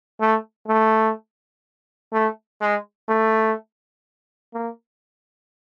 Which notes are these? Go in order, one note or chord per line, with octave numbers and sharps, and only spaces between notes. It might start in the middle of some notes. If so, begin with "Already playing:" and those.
A3
A3
A3
G#3
A3
A#3